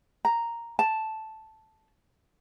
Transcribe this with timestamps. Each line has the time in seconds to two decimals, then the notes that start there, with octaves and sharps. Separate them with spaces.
0.25 A#5
0.79 A5